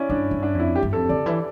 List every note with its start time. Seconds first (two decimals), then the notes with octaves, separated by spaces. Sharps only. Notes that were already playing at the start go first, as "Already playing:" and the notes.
Already playing: C#4 E4 D5
0.09 G2 D4
0.31 G2
0.43 D4
0.55 F2
0.60 E4
0.76 G4
0.83 G2
0.93 F2 A4
1.09 D3 D5
1.26 E3